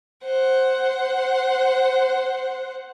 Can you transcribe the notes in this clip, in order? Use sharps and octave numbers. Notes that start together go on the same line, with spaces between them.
C5 F#5